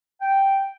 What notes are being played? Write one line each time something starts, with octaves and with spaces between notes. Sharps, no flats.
G5